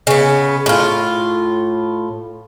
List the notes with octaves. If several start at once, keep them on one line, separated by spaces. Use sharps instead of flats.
C#3 B3
A2 F4